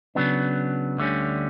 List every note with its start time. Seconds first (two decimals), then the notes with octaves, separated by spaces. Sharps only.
0.15 C#3 F#3 B3 D4
0.98 D2 D3 G3 C#4